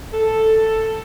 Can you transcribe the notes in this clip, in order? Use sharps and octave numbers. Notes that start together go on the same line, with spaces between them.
A4